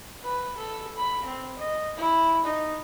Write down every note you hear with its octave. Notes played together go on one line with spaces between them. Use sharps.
B4
A4
B5
C4
D#5
E4
D#4